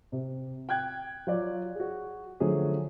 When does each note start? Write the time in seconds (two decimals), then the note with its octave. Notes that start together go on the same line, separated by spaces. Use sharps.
0.12 C3
0.69 G5 F#6 G#6
1.27 F#3 F4 D5
1.75 F#4 G#4
2.40 D3 F3 F#3 A3 G#4